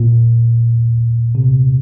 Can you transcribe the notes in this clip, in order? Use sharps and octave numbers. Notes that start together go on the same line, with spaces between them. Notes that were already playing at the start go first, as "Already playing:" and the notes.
Already playing: A#2
C3